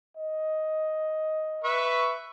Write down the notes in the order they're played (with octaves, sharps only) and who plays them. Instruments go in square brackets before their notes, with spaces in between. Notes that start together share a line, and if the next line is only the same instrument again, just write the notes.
[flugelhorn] D#5
[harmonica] B4 E5 C#6